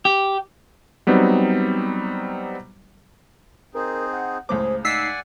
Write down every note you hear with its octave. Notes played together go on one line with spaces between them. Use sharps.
G4
F#3 G3 B3 C4 D#4
C4 D#4 G#4 A#4
F#5
C#2 A2 G#4 C5 D6
D#4 D5 F#5 G#5 E6 B6 C7